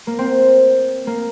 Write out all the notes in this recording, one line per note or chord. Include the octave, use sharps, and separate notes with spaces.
A#3
C4
A#3